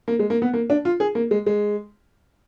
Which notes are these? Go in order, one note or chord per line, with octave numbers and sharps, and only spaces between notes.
A#3
G#3
A#3
B3
A#3
D4
F4
G#4
A#3
G#3
G#3